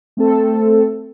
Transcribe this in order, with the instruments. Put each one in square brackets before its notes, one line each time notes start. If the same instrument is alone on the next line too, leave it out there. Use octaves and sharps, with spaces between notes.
[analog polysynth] A3 C4 A4